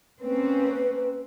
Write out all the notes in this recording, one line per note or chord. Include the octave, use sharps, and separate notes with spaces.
A#3 C4 C#4 B4